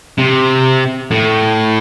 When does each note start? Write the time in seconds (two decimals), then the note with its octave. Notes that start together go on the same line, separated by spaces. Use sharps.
0.18 C3
1.11 A2